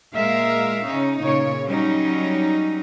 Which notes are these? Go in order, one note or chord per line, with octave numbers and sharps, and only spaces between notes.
A#2 G#3 A#4 E5 F5
C#3 C#4 D#4
A#2 C#3 C#5
F#3 G3 C#4 D#4